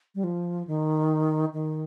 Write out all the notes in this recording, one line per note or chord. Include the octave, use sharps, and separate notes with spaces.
G3
F3
D#3
D#3